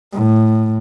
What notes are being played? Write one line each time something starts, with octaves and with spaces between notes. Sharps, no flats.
A2